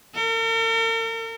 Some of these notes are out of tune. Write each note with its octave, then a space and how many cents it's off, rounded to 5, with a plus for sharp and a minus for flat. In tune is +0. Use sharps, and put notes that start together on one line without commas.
A#4 -45